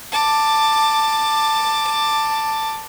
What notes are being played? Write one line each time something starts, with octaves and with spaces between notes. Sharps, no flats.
A5 D6